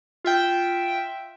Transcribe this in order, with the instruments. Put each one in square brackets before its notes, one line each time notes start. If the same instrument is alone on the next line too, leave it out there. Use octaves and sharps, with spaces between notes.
[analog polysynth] F4 E5 G5